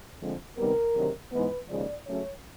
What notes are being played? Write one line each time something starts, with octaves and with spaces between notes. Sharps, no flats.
F2 D3 F3 G#3 C4
C3 D#3 G3 B3 A#4
D2 C3 D#3 F#3
G#2 E3 G#3 B3 B4
D#2 C#3 F3 G#3 D5
C#3 F#3 A3 C#4 C#5